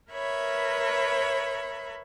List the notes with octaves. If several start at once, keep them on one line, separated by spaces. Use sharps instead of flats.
A#4 B4 C#5 E5 B5